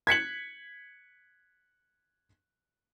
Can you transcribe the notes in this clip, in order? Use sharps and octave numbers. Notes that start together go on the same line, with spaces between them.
G#6 B6 C#7 F#7